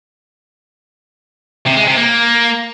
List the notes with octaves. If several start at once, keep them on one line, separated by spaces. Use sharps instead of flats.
C3
G#3
C3
A#3